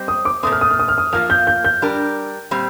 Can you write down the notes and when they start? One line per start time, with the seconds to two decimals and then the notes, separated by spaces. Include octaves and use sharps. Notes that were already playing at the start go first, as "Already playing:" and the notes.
Already playing: G3 C4 G4 C5 D#5
0.08 D#6
0.25 D6
0.43 A#2 A3 C4 D#6
0.52 F6
0.61 D#6
0.71 F6
0.79 D#6
0.88 F6
0.98 D#6
1.12 F3 A#3 F4 F6
1.30 G6
1.47 G6
1.65 G6
1.82 G3 D4 G4 A#4
2.51 A#2 G3 C4